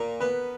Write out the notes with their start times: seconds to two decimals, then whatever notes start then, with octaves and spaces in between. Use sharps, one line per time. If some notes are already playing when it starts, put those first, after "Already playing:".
Already playing: A#2 A#4
0.20 B3 B4